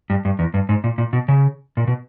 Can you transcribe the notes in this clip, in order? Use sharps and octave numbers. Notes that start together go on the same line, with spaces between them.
G2
G2
E2
G2
G#2
A#2
A#2
B2
C#3
A#2
B2